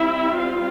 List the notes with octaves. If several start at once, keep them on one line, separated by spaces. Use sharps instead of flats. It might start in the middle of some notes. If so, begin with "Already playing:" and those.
Already playing: G3 C4 E4 E5
F4 F5